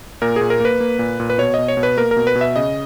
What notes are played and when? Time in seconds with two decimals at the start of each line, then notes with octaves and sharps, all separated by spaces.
0.22 A#2 A#4
0.36 A#2 G#4
0.50 A#4
0.60 A#3 B4
0.80 A#3
0.99 A#2
1.20 A#2
1.30 B4
1.38 B2 C#5
1.54 B2 D#5
1.68 C#5
1.77 B2
1.83 B4
1.97 A#3 A#4
2.11 A#4
2.17 B2
2.27 B4
2.35 B2
2.41 E5
2.56 C#3 D#5